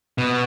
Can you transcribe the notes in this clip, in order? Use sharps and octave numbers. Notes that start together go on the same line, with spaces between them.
B2